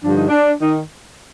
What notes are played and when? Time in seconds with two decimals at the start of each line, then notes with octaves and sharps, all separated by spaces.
0.03 G2 D3 F3 D4
0.16 D#4
0.29 D4
0.61 D#3 D#4